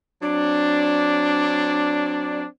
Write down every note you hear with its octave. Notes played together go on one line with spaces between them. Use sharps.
F#3 C4 D4